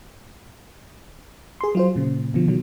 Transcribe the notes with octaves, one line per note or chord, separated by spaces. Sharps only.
G#4 C6
F#3 F4 C5
A#2 C#3
B2 D3 F3
B2 D#3 F#3